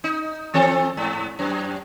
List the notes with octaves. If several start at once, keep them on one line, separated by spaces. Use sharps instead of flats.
D#4
E3 C4 A4
G#2
F#2